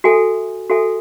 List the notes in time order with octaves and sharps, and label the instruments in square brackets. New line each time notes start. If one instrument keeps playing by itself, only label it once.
[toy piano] F#4 A4 E5 G#5
F#4 A4 E5 G#5